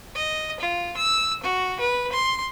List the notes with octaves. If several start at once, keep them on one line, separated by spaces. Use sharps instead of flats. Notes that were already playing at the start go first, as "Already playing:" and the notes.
D#5
F4
E6
F#4
B4
C6